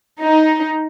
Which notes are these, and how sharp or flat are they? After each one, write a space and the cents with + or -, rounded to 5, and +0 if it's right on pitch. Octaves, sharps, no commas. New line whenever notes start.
D#4 +10